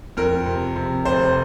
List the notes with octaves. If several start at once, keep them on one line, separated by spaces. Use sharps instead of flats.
F2 A#4
C3
C3
F1 C5